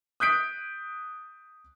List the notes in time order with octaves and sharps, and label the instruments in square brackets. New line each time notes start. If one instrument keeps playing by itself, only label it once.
[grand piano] D#6 F#6 G6 B6 D7